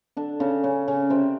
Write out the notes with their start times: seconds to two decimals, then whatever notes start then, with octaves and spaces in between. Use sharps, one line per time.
0.17 D3 D4
0.40 C#3 C#4
0.63 C#3 C#4
0.88 C#3 C#4
1.10 C3 C4